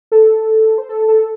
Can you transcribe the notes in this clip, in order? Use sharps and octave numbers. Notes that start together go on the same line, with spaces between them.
A4
C5
A4
A4